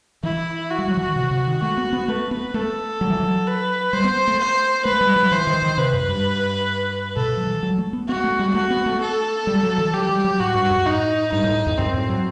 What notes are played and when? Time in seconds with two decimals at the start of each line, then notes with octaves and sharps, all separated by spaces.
0.23 E3 E4
0.70 F#4
0.79 G3
0.88 F#3
0.97 E3
1.07 D#3
1.16 C3
1.31 C3
1.47 D#3
1.62 A3 F#4
1.77 B3
1.93 B3
2.08 A3 B4
2.31 B3
2.54 A3 A4
3.01 F#3
3.10 E3
3.20 F#3
3.47 B4
3.93 G3 C5
4.04 B3
4.28 A3
4.39 C5
4.85 A3 B4
5.01 G3
5.16 F#3
5.32 E3 C5
5.47 D#3
5.62 D#3
5.78 C3 B4
5.93 F#2
6.09 G2
7.16 B2 A4
7.37 F#3
7.47 E3
7.63 F#3
7.78 A3
7.93 B3
8.09 B3 F#4
8.24 A3
8.39 G3
8.54 A3 F#4
8.70 B3
8.86 A3
9.01 A4
9.47 G3
9.63 F#3
9.78 E3
9.93 F#3 G4
10.09 G3
10.24 F#3
10.40 A2 F#4
10.55 G2
10.71 F#2
10.86 A2 D#4
11.32 G2 D#4
11.44 A2
11.67 E2
11.78 F#2 C4
11.94 A2
12.09 F#3